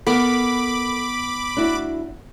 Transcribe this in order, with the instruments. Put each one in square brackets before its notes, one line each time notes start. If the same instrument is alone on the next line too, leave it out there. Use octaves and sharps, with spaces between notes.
[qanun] B3 [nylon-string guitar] A4 A#4 F#5 [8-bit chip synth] B5 D6
[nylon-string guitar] D4 E4 F#4